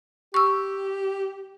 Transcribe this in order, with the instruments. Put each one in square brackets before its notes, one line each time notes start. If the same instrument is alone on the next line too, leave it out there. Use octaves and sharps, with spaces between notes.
[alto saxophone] G4 [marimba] C#6 E6